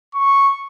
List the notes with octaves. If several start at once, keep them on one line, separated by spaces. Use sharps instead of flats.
C#6